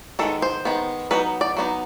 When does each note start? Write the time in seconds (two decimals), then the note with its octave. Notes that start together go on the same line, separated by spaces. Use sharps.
0.19 D#3 G#3 B3 A4
0.42 C5
0.65 D#3 G#3 B3
1.11 F#3 B3 D#4 B4
1.41 D5
1.57 F#3 B3 D#4